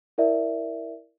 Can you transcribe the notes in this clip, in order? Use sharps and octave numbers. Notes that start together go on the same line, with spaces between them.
E4 A#4 D5 E5